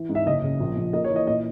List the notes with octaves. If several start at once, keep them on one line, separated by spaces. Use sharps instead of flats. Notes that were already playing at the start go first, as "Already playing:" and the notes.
Already playing: E3
G#2
E5
F#1 D#5
C#3
A#1
A#1
A#3 D#5
C#5
E3
D#5
A#2 D#5